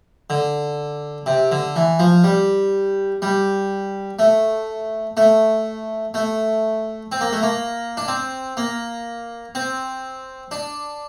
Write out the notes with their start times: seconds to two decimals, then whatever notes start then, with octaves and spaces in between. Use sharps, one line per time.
0.30 D3
1.26 C3
1.52 D3
1.76 E3
1.99 F3
2.24 G3
3.22 G3
4.19 A3
5.17 A3
6.14 A3
7.12 C4
7.21 A#3
7.33 A3
7.43 A#3
7.97 D4
8.08 C4
8.57 A#3
9.55 C4
10.51 D4